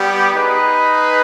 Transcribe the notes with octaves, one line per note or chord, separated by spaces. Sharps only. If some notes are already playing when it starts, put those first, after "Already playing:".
Already playing: G3 B3 G4
D#4 G#4 B4